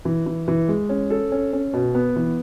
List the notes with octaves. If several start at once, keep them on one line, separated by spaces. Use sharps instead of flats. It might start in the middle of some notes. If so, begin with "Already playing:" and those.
E3
E3
E3
G#3
C#4
A4
C#4
C#4
B2
B3
E3